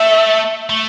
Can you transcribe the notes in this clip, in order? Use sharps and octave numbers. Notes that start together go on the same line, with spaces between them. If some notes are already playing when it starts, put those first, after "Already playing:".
Already playing: A3 E5
A3